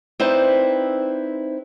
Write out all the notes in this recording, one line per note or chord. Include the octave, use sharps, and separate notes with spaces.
C4 D#4 E4 B4 C5 D5